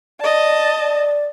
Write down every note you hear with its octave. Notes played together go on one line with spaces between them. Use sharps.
D5 D#5 A5
D5